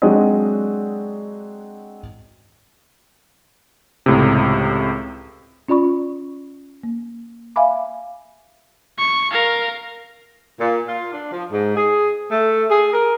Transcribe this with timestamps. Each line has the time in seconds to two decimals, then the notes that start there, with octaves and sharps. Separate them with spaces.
0.02 F#3 G#3 C4 D4 F#4 D#5
4.06 C#2 A2 C3
5.68 C#4 F4 D5 B5 C#6
6.83 A#3
7.56 E5 F5 G#5 B5 D6
8.98 C#6
9.32 A#4 F5
10.60 A#2
10.89 F4
11.12 D4
11.32 F3
11.51 G#2
11.76 G#4
12.32 A3
12.70 G#4
12.93 A#4